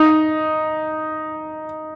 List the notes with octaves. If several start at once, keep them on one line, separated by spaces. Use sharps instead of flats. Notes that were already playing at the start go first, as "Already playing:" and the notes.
Already playing: D#4